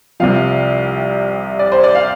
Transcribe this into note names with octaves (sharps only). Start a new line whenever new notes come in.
C2 C3 F3 F5
D5
C5
D5
F5